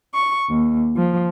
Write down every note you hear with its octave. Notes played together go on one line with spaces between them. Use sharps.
C#6
D#2
F3